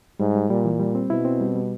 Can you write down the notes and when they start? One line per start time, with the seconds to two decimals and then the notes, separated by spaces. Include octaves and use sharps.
0.20 G#2 G3
0.35 G3
0.50 A#2 G3
0.65 E3
0.80 G3
0.95 C4
1.10 B2 E4
1.25 C4
1.41 G3
1.55 G3